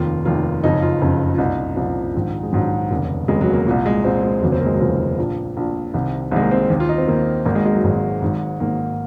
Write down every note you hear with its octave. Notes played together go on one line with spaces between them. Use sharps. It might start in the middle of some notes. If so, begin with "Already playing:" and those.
Already playing: F1 D#2 D#3 F4
F1 D#2 D#3 F4
F#1 F2 C#3 D#4
F4
F#1 F2 C#3
F4
C2 A#2 D#4
C2 A#2 F3
A#1 G#2 D#3
G#3
A#1 G#2 D#3 F#3
F1 D#2 C#3
F1 D#2 C#3 G#3
F#3
A#3
C2 A#2
G#3
C2 A#2 C4
G#3
F1 D#2 C#3 F#3
C4
A#3
G#3
F#3
F1 D#2 C#3 F3
A#1 A#2
A#1 A#2
C2 C3 D#3
C2 C3 D#3 G#3
A#3
C4
D#2 D#3
F4
D#4
C4
D#2 D#3 A#3
G#1 G#2 D#3 A#3
G#3
G#3
F#3
G#1 G#2 D#3
G#1 G#2 D#3
G#1 G#2 D#3 A#3